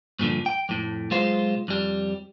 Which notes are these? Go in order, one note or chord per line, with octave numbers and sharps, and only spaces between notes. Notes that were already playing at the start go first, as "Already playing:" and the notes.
G2 A#2 D3 F3
G5
F2 A2
B1 G#3 F4 C5
F2 G3